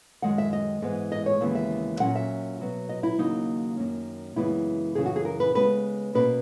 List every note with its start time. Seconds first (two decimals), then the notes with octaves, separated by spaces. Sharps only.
0.22 F#2 D#3 G#3 F#5
0.38 E5
0.53 D#5
0.82 G#2 E3 G#3 B3
1.12 D#5
1.26 C#5
1.41 D#2 C#3 E3 G#3 B3
1.55 E5
2.00 A#2 F#3 C#4 F#5
2.15 E5
2.59 B2 F#3 B3
2.89 D#5
3.03 E4
3.18 D#2 C#3 F#3 A#3 D#4
3.77 F#2 D#3 A#3 C#4
4.36 F#2 C#3 E3 G#3 B3 E4
4.95 F#2 C#3 E3 G#4
5.06 F#4
5.16 G#4
5.25 A#4
5.40 B4
5.55 C#3 G#3 B3 B4
6.15 B2 A#3 C#4 B4